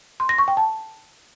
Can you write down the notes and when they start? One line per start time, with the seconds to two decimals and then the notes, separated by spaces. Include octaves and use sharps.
0.20 C6
0.29 A#6
0.38 C#6
0.48 G5
0.57 A5